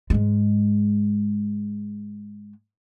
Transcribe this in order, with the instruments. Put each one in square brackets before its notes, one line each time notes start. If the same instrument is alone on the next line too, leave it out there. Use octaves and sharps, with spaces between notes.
[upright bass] G#2 G#3